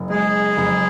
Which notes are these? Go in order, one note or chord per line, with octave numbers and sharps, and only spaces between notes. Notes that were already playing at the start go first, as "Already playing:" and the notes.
Already playing: F#1
G#3 G#4
F#1